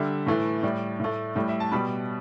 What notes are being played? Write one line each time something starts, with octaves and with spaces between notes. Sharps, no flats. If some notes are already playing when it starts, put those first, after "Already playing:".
Already playing: D3 G3 E5
A2 E3 A3
A2 G3 D5
A2 A3
A2 G3
E5
A5
B2 G3 B5